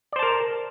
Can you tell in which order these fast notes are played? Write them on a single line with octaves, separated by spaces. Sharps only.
D5 C5 A5 A#4